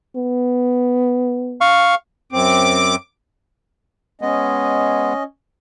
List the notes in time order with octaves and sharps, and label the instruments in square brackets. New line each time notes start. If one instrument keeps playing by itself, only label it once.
[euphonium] B3
[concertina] F5 C#6
[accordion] F#2 C4 [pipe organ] D6
[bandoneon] G#3 B3 [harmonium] C#4 D#5